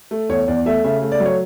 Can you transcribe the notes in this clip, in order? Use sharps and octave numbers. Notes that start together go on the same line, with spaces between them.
A3
E2 C#5
E2 D5
A3 E5
C#3 E5
A3
D5
F#3
C#5